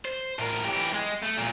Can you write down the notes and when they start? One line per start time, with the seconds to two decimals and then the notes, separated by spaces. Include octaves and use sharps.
0.05 C5
0.39 A2 A#4
0.65 E3 G4
0.94 G#3
1.22 A3
1.37 E2 A#2